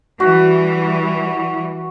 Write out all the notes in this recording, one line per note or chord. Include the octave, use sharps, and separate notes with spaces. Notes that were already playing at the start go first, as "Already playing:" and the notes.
E3 G3 F#4